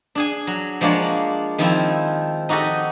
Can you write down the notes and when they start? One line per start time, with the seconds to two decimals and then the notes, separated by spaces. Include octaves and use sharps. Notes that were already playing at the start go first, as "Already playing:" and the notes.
0.15 D4 G#4 G#5
0.47 F#3
0.81 F3 G#3 A#3 D4 C#5
1.58 D#3 F3 C4 E4
2.49 D#4 F#4 G4 A4 D#5